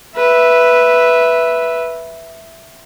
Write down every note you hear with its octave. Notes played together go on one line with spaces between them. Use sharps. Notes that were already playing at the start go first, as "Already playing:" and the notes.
B4 E5